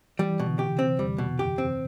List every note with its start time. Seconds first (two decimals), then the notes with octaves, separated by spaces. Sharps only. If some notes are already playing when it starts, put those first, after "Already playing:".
0.19 E3 G3
0.39 B2
0.46 D3
0.59 G4
0.72 C3
0.79 C4
0.99 E2 G3
1.18 B2
1.39 F#2 G4
1.58 C4